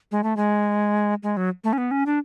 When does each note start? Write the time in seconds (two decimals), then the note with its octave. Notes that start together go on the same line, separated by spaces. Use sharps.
0.11 G#3
0.23 A3
0.37 G#3
1.23 G#3
1.37 F#3
1.64 A3
1.73 C#4
1.78 B3
1.91 C#4
2.06 D4